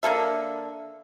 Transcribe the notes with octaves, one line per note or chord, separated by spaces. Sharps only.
D3 A#3 A4 E5